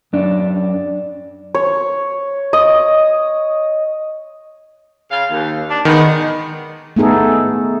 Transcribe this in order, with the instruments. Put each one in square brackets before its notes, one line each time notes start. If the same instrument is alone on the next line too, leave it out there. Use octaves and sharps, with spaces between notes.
[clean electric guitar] F#2 D4
[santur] C#5
D#5
[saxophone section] C#3 F5
D#2
D4
[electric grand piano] D#3 [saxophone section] G#3 B3 D#4
[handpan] A3 B3 D#4 G#4 A4